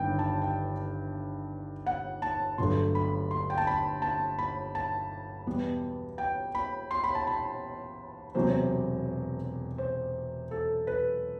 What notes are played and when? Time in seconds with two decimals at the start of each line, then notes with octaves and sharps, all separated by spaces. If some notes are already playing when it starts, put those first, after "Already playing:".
Already playing: G1 G2 D#3 G5
0.19 A5
0.42 G5
1.87 F#5
2.22 A5
2.58 G1 G2 F#3 A3 C6
2.95 B5
3.31 C6
3.50 G5
3.58 A5
3.67 B5
4.02 A5
4.38 B5
4.75 A5
5.47 E2 B2 G3 B3
6.18 G5
6.55 B5
6.91 C6
7.04 B5
7.15 A5
7.27 B5
8.35 E1 E2 C3 F#3 C5
9.78 C5
10.51 A4
10.87 B4